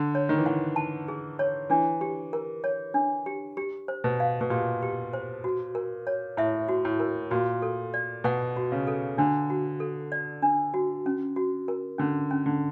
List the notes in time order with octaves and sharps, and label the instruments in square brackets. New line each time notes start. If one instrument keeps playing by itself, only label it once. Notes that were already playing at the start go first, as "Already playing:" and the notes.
Already playing: [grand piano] D3
[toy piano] C#5
[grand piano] D#3
E3
[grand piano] D#3 [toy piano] F#5
[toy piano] A5
G#4
C#5
[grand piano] E3 [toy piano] D4
[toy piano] G4
A#4
C#5
D4
G4
G4
C5
[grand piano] B2
[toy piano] F5
[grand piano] B2
[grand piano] A#2 [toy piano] G4
[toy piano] G4
C5
F#4
A#4
C#5
[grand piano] A2 [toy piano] E5
[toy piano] F#4
[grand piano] A2
[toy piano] A#4
[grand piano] A#2 [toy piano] F#4
[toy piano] A4
D5
[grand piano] B2 [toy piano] F#5
[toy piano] F#4
[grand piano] C#3
[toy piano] A4
[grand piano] D3 [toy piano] D4
[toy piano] F#4
A4
D5
D4
F#4
C#4
F#4
A#4
[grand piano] D3 [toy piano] C#4
[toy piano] C#4
[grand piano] D3